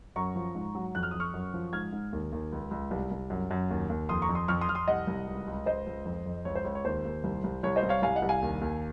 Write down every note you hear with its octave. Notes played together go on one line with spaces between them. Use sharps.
F#2 A#5 C#6
F3
G#2
F#3
F2 F#6
F6
F2 D#6
C#6 F6
F#2
F3
G#2 F6 G#6
G#2
D#2
D#2
C#2
C#2
C2
C2
F#2
F#2
D#2
D#2
F2 C6 D#6
A#5 C#6
F2
C6 D#6
F2 C#6 F6
C6 D#6
F2 F6
C6 D#6
C2 D#5 F#5
C2
C#2
C#2
C#2 C5 D#5
C#2
F2
F2
C#2 C#5
C5
C#2 C#5
C#5
D#2 C5
D#2
C2
C2
C2 C#5
C5 D#5
C2
C#5 F5
C2 F5 G#5
D#5 F#5
C2
F5 G#5
D#2
D#2